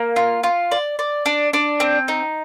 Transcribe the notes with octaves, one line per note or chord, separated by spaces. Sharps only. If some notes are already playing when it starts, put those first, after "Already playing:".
Already playing: A#3
F4
F4
D5
D5
D4
D4
C4
D#4